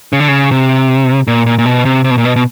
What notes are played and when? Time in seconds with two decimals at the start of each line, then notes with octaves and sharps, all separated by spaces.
0.13 C#3
0.20 D3
0.28 C#3
0.51 C3
1.27 A#2
1.46 A#2
1.58 A#2
1.66 B2
1.85 C3
2.04 C3
2.11 B2
2.18 A#2
2.25 B2
2.36 B2